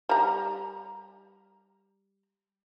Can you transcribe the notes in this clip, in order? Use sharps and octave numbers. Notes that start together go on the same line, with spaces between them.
G3 A#5